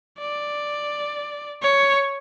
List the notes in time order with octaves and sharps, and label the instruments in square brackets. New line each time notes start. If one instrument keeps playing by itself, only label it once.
[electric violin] D5
C#5